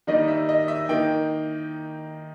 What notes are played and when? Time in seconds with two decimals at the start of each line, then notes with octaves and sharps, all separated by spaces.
0.07 D#3 G3 A#3 D#4 D#5
0.28 E5
0.49 D#5
0.68 E5
0.89 D#3 A#3 D#4 G5